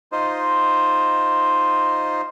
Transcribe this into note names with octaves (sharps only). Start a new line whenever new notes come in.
D#4 F4 C5 D#5